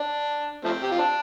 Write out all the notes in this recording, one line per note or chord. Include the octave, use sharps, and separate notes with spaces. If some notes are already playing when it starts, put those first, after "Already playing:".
Already playing: D4
F3 A3 C4
G4
F4
D4